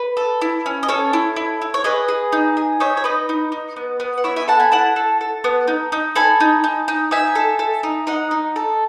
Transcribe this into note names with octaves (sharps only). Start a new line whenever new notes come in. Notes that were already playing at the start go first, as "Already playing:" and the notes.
Already playing: B4
A4
E4
C#4
D#5
C#4 A4 C#5
E4
E4
E4
C#5
G#4 B4 D#5
G#4
D#4
G#4
D#4 C#5 E5
C#5
D#4 B4 D#5
D#4
D#4
B3
B3
F#5
E4 C#5 E5
E5 G#5
A4 F#5 A5
G#5 B5
E4 F#5 A5
A4
A4
B3
D#4
D#4
A4 G#5 B5
D#4
D#4
D#4
D#4 E5 G#5
A4
A4
D#4
D#4 D#5 F#5
D#4
A4